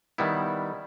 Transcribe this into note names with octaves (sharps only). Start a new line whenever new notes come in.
D#3 G3 B3 E4